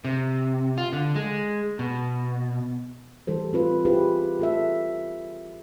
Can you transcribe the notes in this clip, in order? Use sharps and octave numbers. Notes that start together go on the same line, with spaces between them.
C3
F4
D3
G#3
B2
E3 G3 A4 C5
C4 F4 B4
E4 F4 G4 G#4 B4 C5
F4 A4 E5